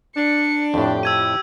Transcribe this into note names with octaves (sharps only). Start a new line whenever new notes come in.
D4 C#7
F2 A2 G4
E6 G#6 D#7